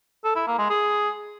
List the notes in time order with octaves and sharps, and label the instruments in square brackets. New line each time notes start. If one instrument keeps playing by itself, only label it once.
[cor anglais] A4
E4
A#3
G#3
G#4